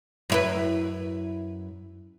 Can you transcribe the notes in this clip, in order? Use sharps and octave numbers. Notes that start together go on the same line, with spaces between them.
F#2 E4 B4